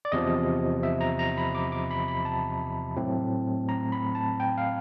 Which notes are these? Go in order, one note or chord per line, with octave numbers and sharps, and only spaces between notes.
D5
E2 C3 F3 D#5
E5
A#5
A#5
B5
D6
D6
B5
B5
A5
A2 F#3 A3 C4
A#5
B5
A5
G5
F5